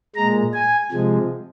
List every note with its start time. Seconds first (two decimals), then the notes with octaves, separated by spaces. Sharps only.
0.16 A#2 G#3 A#5
0.54 G#5
0.91 C3 F3 G#3